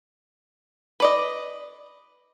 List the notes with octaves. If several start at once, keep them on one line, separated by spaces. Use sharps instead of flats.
B4 D5 D#5